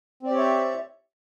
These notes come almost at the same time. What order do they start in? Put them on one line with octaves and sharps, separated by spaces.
C4 D5 G4 C#5 E5